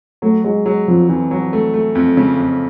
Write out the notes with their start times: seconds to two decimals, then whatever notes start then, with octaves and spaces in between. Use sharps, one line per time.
0.22 F#3 A3
0.44 F#3 G#3
0.66 F#3 G#3
0.88 F2 F3
1.09 F2 E3
1.31 F#3
1.53 A3
1.74 A3
1.95 F2
2.17 C#3
2.38 F2